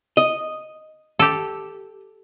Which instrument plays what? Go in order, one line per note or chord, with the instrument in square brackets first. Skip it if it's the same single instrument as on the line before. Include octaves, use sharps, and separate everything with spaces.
[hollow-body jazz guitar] D#5
[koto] G4 A4